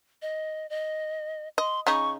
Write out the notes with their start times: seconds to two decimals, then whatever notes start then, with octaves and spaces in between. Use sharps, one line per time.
0.22 D#5
0.70 D#5
1.58 D#5 C6
1.87 C#3 D#4 C#6